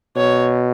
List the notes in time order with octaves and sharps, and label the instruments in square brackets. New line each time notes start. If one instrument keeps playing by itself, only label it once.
[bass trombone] B2 [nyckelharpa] C#5